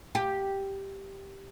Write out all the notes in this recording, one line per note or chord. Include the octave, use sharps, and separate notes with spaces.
G4